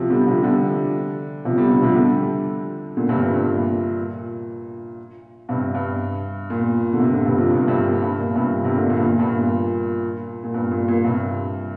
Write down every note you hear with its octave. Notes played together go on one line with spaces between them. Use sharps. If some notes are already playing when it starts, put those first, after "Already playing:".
Already playing: C3 F3
D3 G3
C3 F3
D3 G3
C3 F3
D3 G3
D3 G3
C3 F3
D3 G3
A#2 D3
G2 C3
G2
G2
A#2
G2 C3
G2
A#2
D3
G2 C3
A#2 D3
G2 C3
C3 F3
G2 C3
G2 C3
A#2
G2
A#2
G2 C3
G2 C3
A#2 D3
A#2
G2
A#2
G2
A#2
A#2
G2
A#2
A#2
G2 C3